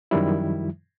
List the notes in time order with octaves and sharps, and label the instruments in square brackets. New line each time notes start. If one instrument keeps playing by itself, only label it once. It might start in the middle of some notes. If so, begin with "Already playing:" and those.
[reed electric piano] F#2 D#3 F3 G3 E4